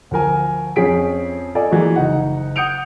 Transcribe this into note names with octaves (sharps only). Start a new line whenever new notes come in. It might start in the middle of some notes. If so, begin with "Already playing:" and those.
D2 F3 A#4 G#5
F2 F3 C#4 G#4 B6 D7
F4 A4 D5 D#5 G#5
E3 F3 G#3 A#3 F#4
F#1 D#4 F#5
F#5 D#6 G6 C#7 D7 F7